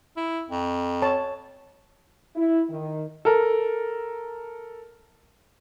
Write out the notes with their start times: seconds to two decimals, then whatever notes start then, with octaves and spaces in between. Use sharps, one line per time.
0.16 E4
0.48 F2
1.02 C#5 A5
2.35 E4
2.69 D#3
3.25 A4 A#4